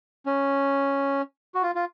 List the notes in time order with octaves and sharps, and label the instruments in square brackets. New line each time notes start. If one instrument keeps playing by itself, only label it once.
[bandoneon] C#4
F#4
F4
F4